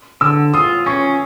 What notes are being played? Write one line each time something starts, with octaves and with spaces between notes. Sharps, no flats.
D3 E6
F4 D#6
C#4 C#6